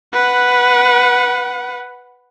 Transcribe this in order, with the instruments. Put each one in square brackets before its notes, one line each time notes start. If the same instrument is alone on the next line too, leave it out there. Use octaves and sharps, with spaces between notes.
[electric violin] B4 F#5